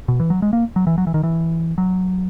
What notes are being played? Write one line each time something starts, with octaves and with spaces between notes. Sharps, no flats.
B2
E3
F#3
G#3
A#3
F#3
E3
F#3
E3
D#3
E3
F#3